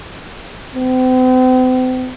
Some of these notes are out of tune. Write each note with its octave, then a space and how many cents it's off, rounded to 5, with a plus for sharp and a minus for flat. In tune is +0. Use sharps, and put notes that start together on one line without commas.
C4 -40